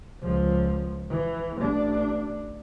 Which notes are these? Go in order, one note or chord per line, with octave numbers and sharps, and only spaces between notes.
C#2 F3
E3
A1 D4